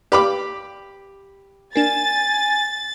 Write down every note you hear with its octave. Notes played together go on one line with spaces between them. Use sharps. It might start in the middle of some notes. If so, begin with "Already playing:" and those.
G4 B4 D5 F5 B5 D6
A#3 D4 G#5 A6 E7